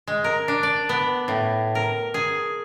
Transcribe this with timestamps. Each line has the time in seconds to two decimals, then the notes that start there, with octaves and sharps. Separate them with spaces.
0.07 G#3
0.24 A#4
0.48 D4
0.63 D5
0.89 B3
1.28 A2
1.75 A#4
2.14 G#4